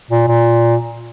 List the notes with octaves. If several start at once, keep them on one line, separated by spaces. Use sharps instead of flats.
A#2
A#2